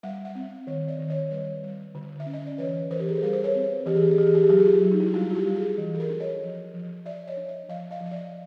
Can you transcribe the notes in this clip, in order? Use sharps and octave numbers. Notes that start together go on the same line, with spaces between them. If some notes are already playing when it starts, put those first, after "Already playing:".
G3 E5 F#5
E5 F#5
C4
D#3 C#5 D#5
D5 E5
D#3
C#5 D#5
G3 B4 C#5
G3
D3
E5
C#4
D#5
D5
E3 B4 C#5
E3 A#4 C5
G4
G#4
A4
G3 G#4 A#4
C5
B4 C#5
C4
E3 G4
G#4
G4
G#4
E3 G4
G#4
G4
G#4
F#3 G4
G#4
F4 G4
F#3
D#4
E4
F4
G3 E4 F#4
F#4
F4 G4
G3
F#4 G#4
E3
A4
G#4 A#4
D4
C#5 D#5
F3
F3
F3 D5 E5
C#5 D#5
D4
D5 E5
F3 D#5 F5
D#5 F5
F3
D#5
D5 E5